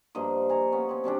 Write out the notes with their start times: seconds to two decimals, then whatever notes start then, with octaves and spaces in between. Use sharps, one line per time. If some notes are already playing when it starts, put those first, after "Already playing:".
0.15 G2 F3 A#3 D#5
0.49 G#5 A#5 C#6
0.72 B3 C#4
0.89 C4 C#4
1.04 C3 G3 C#4 D4